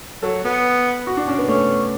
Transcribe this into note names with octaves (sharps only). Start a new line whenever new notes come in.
F#3 A4
B3
F#4
D4
C#4 D4
B3
A3 C#4